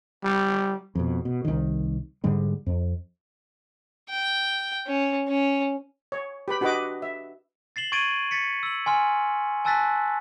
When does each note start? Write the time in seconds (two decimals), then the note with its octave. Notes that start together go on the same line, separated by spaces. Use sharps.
0.24 G3
0.95 F2 B2
1.25 B2
1.45 C2 D#3
2.24 G#2 D3 G3 G#3
2.66 F2
4.10 G5
4.86 C#4
5.28 C#4
6.12 C#5
6.48 G4 B4 B5
6.61 D4 F#4 G4 B4 D#5 D6
7.02 E5
7.76 A6 C7 E7 F#7 G7
7.92 C#6 G#6 A6 D7 D#7 F#7
8.31 A6 B6 C#7
8.63 E6 F#7
8.86 G#5 C6 F6
9.65 G#5 A5 E6 F#6 A6 B6